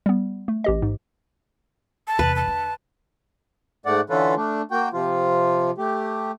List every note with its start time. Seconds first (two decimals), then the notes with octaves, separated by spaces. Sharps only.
0.06 G3 B3
0.48 A3
0.64 A1 G4 D#5
0.82 G#2
2.08 A5
2.19 E2 C3 B4
2.36 A5
2.48 D3
3.86 G#2 A3 D5 F#5
4.10 D3 E3 C#4 F4 A4 B4
4.36 A3 D4
4.71 A#3 F#4 G5
4.93 C3 F3 F4
5.78 A3 G4